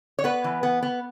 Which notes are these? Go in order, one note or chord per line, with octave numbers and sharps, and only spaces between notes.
C#5
B3 B4
E3
B3
B3